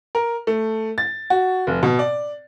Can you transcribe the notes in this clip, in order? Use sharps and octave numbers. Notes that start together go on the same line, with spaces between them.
A#4
A3
A6
F#4
F1
B2
D5